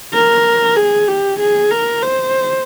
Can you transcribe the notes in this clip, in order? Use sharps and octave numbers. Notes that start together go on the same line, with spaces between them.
A#4
G#4
G4
G#4
A#4
C5